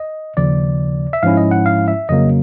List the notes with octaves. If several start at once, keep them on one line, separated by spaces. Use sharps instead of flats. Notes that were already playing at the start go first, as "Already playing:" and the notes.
Already playing: D#5
D#2 C#3 F3 D5
E5
G#2 F3 G#3 C#4 E4 F5
D#5
F#5
F5
E5
F2 C#3 F#3 A#3 D#5